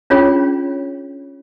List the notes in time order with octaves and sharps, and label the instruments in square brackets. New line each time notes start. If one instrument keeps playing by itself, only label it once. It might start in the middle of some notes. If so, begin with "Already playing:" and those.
[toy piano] C#4 D4 F4 G#4 C#5 G5